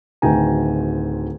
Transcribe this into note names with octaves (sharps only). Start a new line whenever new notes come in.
D1 D2 D#3 G5 G#5 A#5